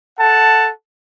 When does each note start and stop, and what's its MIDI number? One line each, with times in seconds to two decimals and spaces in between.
0.19 0.71 69
0.19 0.71 78
0.19 0.71 81